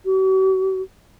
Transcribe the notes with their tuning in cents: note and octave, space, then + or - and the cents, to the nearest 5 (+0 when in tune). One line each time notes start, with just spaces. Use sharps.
F#4 +45